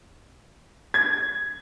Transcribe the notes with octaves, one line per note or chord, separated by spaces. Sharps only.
G#6